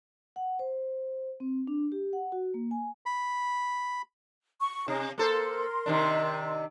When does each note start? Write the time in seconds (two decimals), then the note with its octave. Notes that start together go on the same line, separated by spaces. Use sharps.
0.36 F#5
0.59 C5
1.40 C4
1.67 D4
1.92 G4
2.13 F#5
2.32 F#4
2.54 A#3
2.71 G#5
3.06 B5
4.61 C#6
4.88 C3 C#4 D#4
5.18 A#3 A4 A#4 C5 C6
5.86 C3 D#3 D4